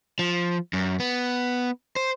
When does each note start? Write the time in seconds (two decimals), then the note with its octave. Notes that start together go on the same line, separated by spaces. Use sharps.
0.19 F3
0.73 F#2
1.00 B3
1.96 C5